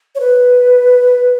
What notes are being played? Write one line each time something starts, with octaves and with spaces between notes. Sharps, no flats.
C#5
B4